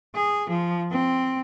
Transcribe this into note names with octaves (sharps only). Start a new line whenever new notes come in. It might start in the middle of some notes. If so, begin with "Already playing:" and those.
G#4
F3
C4